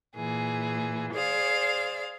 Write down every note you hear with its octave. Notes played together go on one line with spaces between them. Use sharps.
A#2 E3 G#4
G#4 C5 D5 F5